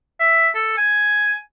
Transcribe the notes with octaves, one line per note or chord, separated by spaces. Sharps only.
E5
A4
G#5